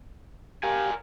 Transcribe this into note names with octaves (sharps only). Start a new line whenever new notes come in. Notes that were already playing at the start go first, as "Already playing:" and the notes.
G4 A#4 F5 G#5